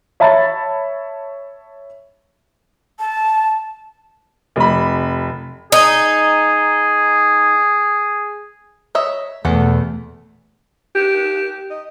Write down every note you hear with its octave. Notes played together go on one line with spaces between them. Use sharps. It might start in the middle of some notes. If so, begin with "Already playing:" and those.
C#5 E5 A5 B5 A6
A5
F1 B5
D#4 G#4
C#5 D#5 E5
E2 B2 A3 A4 F#5
G4
D#5